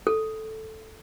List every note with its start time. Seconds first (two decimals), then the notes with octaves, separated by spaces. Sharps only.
0.07 A4